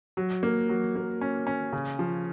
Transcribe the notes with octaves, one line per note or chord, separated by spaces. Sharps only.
F#3
A#3
F#3
A#3
C#4
C#4
C#3
F3